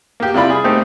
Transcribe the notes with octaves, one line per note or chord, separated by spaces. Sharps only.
A#3 G4
C3 G3 E4 F4 D5 B5
G#4
A3 A#3 C4 D#4 G4